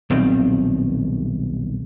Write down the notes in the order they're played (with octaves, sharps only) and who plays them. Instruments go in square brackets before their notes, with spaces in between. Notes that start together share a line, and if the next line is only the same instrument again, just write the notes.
[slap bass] D#1 B1 D#3 C4